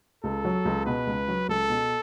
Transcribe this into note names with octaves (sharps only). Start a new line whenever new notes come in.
C#2 A4
F#3
C#2
B2 B4
C#2
F#3
C#2 A4
B2